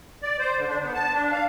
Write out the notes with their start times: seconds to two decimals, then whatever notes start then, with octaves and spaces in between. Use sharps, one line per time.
0.23 D5
0.39 C5
0.57 D3
0.69 D4
0.82 B3
0.95 A5
1.14 D4
1.32 F5